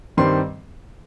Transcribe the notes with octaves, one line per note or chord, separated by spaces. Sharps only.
G2 D#3 G3 C4 C6